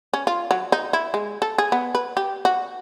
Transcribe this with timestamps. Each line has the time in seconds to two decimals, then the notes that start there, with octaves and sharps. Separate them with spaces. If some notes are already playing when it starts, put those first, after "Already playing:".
0.14 C#4
0.27 F4
0.51 F#3
0.72 D#4
0.93 E4
1.14 G#3
1.42 A4
1.58 G#4
1.72 B3
1.95 B4
2.17 G4
2.45 F#4